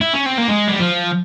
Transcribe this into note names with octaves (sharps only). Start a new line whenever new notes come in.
E4
C#4
C4
A#3
G#3
G3
F3